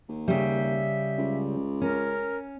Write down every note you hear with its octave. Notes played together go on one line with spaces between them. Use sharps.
D#2
C#3 G3 E5
C#2
C#4 A#4